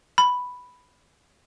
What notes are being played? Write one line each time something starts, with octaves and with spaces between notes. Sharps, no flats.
B5